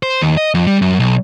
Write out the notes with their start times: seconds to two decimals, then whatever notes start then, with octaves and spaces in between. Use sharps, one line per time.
0.03 C5
0.21 D#2
0.37 D#5
0.54 F2
0.67 G3
0.82 F#2
1.00 B1